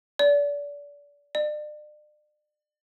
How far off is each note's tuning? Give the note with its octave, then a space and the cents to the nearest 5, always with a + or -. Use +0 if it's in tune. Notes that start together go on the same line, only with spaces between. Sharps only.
D5 -30
D5 +40